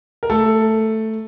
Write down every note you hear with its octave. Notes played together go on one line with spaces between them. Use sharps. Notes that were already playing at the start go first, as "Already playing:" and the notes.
A#4
A3 A4